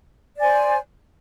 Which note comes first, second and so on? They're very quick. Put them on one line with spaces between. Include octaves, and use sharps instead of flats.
D5 G#5 C5